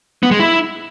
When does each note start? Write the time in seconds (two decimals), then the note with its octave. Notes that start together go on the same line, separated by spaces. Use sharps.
0.23 B3
0.31 G#3
0.40 E4